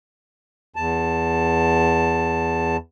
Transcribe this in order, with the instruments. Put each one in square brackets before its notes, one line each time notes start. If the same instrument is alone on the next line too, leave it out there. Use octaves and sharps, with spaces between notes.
[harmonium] E2 A5